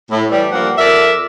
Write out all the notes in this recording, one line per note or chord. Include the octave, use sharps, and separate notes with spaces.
A2
E3 G3
G2 F3 A#3 D4 F#5
F2 A#4 D5 E5